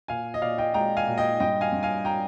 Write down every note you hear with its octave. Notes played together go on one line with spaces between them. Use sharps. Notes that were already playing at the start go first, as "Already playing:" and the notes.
A#2 F5 G#5
D#5
A#2 D5 F5
D#5 G5
G#3 G5 A#5
F5 G#5
A#2
D#5 G5
G2 D#5 G5
F5 G#5
G2
F5 G#5
G5 A#5